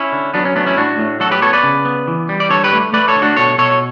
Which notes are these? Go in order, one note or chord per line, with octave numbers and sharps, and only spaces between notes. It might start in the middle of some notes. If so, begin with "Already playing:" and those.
Already playing: C#4 E4
D3
F#3 B3 D4
C#4
A3 B3 D4
C#4 E4
A2 D4 F#4
A2
F#3 F#4 A4
G4 B4
B3 A4 C#5
B4 D5
C#3
B3
E3
G3
D5
D3 A4 C#5
G4 B4
A3
A3 B4 D5
A4 C#5
D3
D4 F#4
B2 A4 C#5
B2 A4 C#5